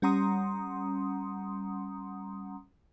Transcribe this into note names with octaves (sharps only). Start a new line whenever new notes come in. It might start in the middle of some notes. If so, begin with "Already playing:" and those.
G3 C#4 F#5 A#5 C6 D#6